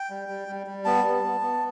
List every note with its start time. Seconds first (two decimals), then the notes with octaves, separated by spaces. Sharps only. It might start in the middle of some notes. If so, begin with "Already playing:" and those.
Already playing: G5
0.10 G3
0.29 G3
0.48 G3
0.67 G3
0.85 B3 A5
1.04 B3
1.24 B3
1.41 B3